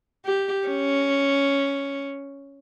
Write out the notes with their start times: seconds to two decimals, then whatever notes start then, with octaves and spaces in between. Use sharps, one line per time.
0.26 G4
0.67 C#4